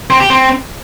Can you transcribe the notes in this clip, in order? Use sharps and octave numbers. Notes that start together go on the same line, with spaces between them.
C4
G4
C4